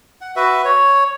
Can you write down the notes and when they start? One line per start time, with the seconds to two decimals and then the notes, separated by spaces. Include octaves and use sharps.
0.21 F#5
0.36 F#4 B4 E5
0.65 C#5